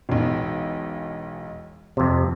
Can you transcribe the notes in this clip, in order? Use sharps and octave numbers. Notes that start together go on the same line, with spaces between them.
E1 B1
F2 C3